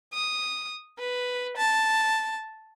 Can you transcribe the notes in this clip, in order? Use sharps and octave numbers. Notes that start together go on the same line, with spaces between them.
D#6
B4
A5